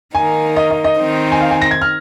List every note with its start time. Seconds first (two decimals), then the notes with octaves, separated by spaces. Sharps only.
0.15 D#3 A#3 D#4 G#5
0.56 D#5
0.71 D#5
0.84 D#5
0.98 D#3 C4 D#4
1.32 G#5
1.40 F5
1.51 G#5
1.62 A#6
1.71 G#6
1.82 F6